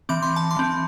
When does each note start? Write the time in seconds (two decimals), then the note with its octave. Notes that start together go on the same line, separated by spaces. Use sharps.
0.09 E3 C4 D6
0.22 C6
0.36 A5
0.51 C6
0.57 E3 C4